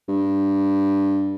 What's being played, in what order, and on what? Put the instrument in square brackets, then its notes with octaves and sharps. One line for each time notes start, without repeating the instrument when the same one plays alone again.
[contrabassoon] G2